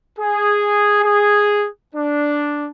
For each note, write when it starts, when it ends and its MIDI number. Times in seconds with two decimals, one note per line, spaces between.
0.17 1.01 68
1.02 1.66 68
1.95 2.68 62